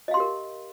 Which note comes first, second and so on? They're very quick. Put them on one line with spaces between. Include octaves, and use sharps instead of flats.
D#5 F5 C6 G4 A#4